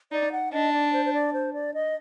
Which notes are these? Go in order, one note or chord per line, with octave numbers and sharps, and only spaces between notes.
D#4 D5
F#5
D4 D#5
D5
C5
C5
D5
C5
D5
D#5